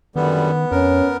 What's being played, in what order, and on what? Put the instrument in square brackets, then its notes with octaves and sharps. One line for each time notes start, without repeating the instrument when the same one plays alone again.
[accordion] F#2 D3 G3 [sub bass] D#3 [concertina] B3
[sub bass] F2 [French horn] C#4 [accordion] A#4